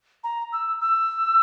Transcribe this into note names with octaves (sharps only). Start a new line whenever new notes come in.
A#5
E6
E6